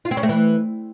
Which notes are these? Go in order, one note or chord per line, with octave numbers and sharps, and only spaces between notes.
F4
C4
C#4
A3
E3